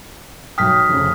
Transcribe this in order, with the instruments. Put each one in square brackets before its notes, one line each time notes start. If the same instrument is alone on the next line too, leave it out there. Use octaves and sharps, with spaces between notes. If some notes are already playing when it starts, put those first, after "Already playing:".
[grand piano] B1 G5 [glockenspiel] D#6 F6 B6
[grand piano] F1 C#3